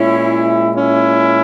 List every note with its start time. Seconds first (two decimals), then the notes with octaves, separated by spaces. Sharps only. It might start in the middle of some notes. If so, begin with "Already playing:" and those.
Already playing: A#2 G#3 C#4 E4
0.75 C#4 E4